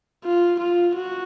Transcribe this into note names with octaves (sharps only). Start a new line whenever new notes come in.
F4
F4
F#4